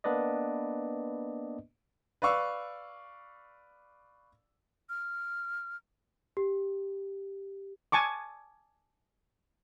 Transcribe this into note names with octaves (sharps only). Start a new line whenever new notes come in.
A#3 B3 D4 B4 D5 D#5
B4 D5 F5 C#6 E6
F6
G4
G#5 A5 C#6 D6